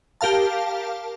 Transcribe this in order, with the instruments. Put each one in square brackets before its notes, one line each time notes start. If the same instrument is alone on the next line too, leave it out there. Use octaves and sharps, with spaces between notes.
[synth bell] G4 A#4 F5 A5